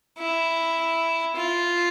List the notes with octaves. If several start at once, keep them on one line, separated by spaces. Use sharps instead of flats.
E4
F4